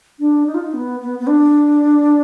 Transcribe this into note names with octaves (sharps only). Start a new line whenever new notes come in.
D4
D#4
F4
D#4
B3
B3
B3
D4